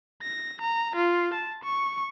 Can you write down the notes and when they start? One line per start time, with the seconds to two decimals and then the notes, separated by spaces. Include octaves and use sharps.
0.22 A#6
0.61 A#5
0.96 F4
1.34 A5
1.64 C#6